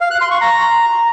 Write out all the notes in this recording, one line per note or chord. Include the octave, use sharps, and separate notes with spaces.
F5
F#6
C6
C#6
A#5